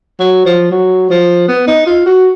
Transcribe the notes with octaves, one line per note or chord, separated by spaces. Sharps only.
F#3
F3
F#3
F3
B3
D#4
F4
F#4